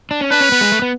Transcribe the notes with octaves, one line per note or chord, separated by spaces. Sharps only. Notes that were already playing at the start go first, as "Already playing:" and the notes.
D4
C#4
D4 B4
C#4
B3
G#3
A3
B3